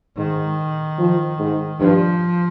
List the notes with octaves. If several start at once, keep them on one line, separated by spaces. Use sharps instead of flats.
G#2 D#3
F3
G#2
G2 F3